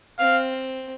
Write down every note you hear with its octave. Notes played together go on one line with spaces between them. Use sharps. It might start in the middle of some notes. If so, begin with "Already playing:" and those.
C4 F5